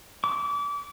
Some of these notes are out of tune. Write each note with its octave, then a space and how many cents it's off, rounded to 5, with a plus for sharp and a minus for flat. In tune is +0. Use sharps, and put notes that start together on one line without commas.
D6 -30